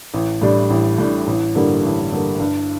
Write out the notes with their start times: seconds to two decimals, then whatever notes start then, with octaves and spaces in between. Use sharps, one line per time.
0.14 A1
0.42 A2 G3 D4
0.70 A1
0.98 A2 G3 D4
1.27 A1
1.55 G2 D3 G3 A#3
1.83 A1
2.11 G2 D3 G3 A#3
2.40 G2